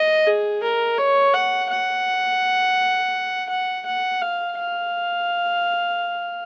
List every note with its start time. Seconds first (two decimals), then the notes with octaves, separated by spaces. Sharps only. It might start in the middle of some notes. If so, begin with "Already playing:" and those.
Already playing: D#5
0.26 G#4
0.63 A#4
0.98 C#5
1.34 F#5
1.70 F#5
3.49 F#5
3.86 F#5
4.21 F5
4.58 F5